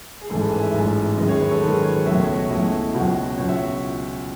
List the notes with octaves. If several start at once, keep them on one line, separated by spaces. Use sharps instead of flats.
G#4
A1 G#2 E3 G#3 A4
B4
G#5
E5
A1 G#2 E3 G#3
F#2 D#3 G#3 D#5
C#5
B4
A4
F#2 D#3 G#3 B4
C#5
C#2 B2 F#3 A3 E5
C#5
D#5
C#2 B2 F#3 A3 E4
C#2 B2 F#3 F#4
C#2 B2 F#3 C#5
E5